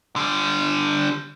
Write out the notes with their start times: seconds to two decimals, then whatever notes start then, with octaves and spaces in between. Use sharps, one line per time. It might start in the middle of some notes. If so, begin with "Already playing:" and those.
0.16 D3 G3